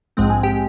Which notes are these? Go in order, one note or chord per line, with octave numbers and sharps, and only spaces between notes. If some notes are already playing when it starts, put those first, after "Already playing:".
A#1 G#2 F3 G#3 C4 G5
G#5
G4 G5